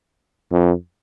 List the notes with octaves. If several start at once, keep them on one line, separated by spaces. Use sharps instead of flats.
F2